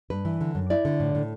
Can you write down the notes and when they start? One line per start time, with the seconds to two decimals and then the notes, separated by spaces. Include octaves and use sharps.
0.10 G2 B4
0.25 E3
0.41 D3
0.55 F#2
0.70 E4 D5
0.85 D3
1.00 A2
1.15 A2